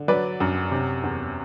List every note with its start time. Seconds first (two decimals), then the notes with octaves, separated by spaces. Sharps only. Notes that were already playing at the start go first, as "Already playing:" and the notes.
Already playing: D3
0.08 F#3 B4 D5
0.40 F#2
0.71 C3
1.03 E2